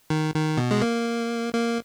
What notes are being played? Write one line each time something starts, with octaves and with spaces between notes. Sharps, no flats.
D#3
D#3
B2
G#3
A#3
A#3